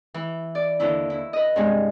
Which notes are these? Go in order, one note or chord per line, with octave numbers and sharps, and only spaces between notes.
E3
D5
D#2 D3 E4
E4
B4 D#5
G2 C3 G3 G#3